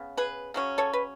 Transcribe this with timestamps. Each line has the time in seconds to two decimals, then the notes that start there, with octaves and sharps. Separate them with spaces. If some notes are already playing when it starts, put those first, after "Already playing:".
Already playing: C#3 B3
0.17 G#4 B4
0.54 C#3 F#3 C#4
0.78 A4 C#5
0.93 B4